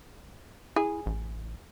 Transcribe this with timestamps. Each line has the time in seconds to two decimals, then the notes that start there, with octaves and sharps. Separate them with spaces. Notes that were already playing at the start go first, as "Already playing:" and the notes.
0.76 E4 G#4
1.06 A1